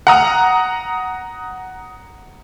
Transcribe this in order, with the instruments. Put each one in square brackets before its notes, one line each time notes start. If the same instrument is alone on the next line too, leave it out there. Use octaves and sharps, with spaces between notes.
[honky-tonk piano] F#5 A#5 D#6